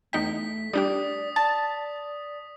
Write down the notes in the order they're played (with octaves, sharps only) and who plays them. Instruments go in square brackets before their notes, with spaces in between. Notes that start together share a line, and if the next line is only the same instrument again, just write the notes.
[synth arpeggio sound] E2 D#4 G5 [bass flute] A3 [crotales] B6
[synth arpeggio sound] G3 D4 G4 [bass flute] D5 [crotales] D#6
[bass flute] D5 [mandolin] A5